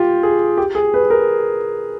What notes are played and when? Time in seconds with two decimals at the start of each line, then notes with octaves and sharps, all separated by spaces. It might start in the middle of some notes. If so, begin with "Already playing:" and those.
Already playing: F4 G4
0.23 G#4
0.58 G4
0.75 G#4
0.94 B4
1.10 A#4